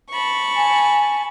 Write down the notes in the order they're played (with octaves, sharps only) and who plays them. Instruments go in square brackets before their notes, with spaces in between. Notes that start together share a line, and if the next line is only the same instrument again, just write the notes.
[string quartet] A5 B5 C#6
[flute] G#5